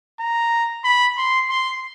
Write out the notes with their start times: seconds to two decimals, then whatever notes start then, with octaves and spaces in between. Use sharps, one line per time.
0.20 A#5
0.84 B5
1.18 C6
1.50 C6